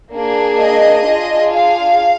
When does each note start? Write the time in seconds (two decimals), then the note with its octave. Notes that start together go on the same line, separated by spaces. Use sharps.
0.14 A#3 D4 G#4
0.60 D#5
1.06 D4 F4 G#4
1.52 F5